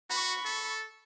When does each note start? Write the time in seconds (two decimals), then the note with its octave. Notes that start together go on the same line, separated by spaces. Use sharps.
0.10 F#4 B5 C#6
0.45 A4